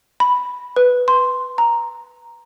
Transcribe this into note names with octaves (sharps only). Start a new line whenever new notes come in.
B5
B4
C6
A#5